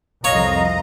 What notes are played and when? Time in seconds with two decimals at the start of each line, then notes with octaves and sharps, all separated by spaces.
0.24 C2 F2 C#5 D#5 F5 A#5